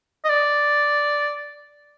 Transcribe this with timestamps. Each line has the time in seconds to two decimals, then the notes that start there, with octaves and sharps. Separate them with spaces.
0.24 D#5
0.29 D5